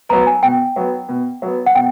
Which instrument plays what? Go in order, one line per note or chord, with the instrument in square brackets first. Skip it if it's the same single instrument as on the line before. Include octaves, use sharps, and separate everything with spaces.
[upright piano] F#3 B3 [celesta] A#5
[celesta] G#5
[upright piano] B2 [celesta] G5
[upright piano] F#3 B3
B2
F#3 B3
[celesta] F#5
[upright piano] B2 [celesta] G5